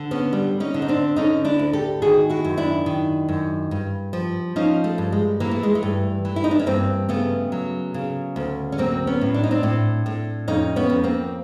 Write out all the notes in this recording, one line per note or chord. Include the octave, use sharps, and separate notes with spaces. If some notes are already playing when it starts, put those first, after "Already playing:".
Already playing: D3
B3 C#4
G3
C#4 D#4
D3
D#4
C4 D4
D3 C#4 D#4
D4 E4
D2
G4 A4
D#3 F#4 G#4
E4 F#4
F#2
D4 E4
D#3
F#2
G2
F3
F3 C#4 D#4
A3
G2
G#3
E3 A#3
A3
G#3
A3
G2
E3
E4
D#4
D4
C#4
G2 A#3 C4
C#3 A3 B3
F#3
C#3
D2
C#4
F#3 A#3 C4
B3 C#4
A2
D4
D#4
C4 D4
A2
A2
F2 C#4 D#4
B3 C#4
F2
A#3 C4